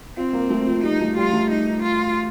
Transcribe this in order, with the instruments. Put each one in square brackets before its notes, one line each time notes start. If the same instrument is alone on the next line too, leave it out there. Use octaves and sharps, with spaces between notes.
[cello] C4 [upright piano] F4
[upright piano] A#3
A3
F3
[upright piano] G3 [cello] D#4
[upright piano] A3
[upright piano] G3 [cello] F4
[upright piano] A3
[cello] D#4
F4